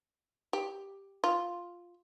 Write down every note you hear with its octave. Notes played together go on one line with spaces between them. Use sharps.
G4
F4